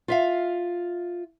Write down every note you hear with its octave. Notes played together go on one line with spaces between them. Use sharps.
F4 E5 F5